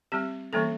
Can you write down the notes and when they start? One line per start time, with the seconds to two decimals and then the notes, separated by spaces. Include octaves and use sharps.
0.12 G3 C4 G4
0.53 E3 G3 A#3 C#4 A4